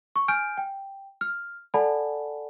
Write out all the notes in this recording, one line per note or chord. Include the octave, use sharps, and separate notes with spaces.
C#6
G#5 F6 G6 D7
G5
F6
A4 D5 F#5 G#5 A5 B5